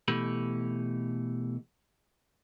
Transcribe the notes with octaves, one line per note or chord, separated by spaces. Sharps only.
B2 E3 A3 G4 B5